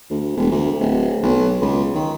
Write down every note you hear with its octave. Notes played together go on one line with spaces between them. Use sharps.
D2
E1
D2
D1
B1
C#2
D#3